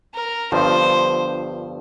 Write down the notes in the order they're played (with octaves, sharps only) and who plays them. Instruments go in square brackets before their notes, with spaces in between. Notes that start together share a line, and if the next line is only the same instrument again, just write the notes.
[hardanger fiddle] A#4
[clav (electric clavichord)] G1 G2 F3 [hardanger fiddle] C5